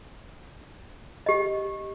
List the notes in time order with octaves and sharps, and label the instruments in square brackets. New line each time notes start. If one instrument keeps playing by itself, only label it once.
[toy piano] G4 D#5